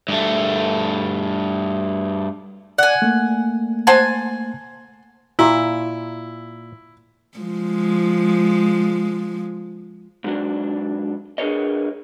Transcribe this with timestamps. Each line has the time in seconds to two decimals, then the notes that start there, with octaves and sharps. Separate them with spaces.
0.09 G2 A3
2.78 D5 F#5 G#5
3.02 A3 A#3
3.87 C5 F#5 G#5 A5
5.39 A#2 E4
7.38 F3 G#3
10.24 G#2 F#3 D4
11.38 D4 G#4 A#4 B4 C#5 D#5